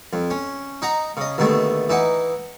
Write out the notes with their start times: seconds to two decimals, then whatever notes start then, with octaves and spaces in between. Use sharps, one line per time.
0.13 F2
0.30 C#4
0.82 D#4 F#5 A#5
1.17 C#3 D#5
1.38 D#2 B2 D3 A3
1.89 E3 D#4 F#5